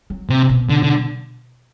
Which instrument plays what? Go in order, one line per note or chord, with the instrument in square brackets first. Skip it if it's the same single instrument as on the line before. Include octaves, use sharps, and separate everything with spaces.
[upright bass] F#3
[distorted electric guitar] C3
[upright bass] B2
[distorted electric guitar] D3
D3